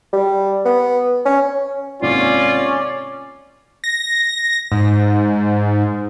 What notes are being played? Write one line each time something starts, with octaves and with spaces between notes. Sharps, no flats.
G3
B3
C#4
G#1 C3 A#3 C#4 F4 D5
A#6
G#2